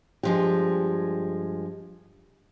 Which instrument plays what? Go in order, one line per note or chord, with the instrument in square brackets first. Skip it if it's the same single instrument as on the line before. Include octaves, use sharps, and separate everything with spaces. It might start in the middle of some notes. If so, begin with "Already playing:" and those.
[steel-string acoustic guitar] G2 F3 G#3 [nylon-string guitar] G4